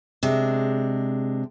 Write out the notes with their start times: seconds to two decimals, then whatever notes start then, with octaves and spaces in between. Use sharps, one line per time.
0.23 C3 G#3 D4